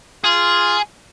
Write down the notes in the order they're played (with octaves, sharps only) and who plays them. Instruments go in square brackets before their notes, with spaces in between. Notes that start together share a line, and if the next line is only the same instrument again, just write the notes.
[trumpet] F4 [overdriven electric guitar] G#4